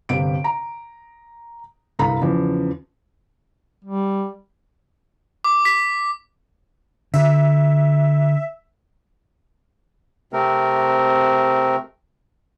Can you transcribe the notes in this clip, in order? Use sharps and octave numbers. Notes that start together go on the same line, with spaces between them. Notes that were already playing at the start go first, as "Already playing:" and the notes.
G1 C3 D7
A#5
C2 G2 A4 F5 A#5 B5
E2 C#3 F3
G3
D6
B6
D3 E5
C3 A3 C4 A#4